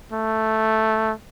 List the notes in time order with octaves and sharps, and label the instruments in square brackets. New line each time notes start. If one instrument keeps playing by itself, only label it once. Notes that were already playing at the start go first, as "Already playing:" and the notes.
[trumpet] A3